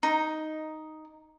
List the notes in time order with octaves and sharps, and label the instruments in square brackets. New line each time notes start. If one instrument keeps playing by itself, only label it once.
[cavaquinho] D#4